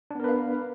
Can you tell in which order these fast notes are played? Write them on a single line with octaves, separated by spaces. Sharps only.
D4 B3 A#4 B4 F5